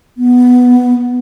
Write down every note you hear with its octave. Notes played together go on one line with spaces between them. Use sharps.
B3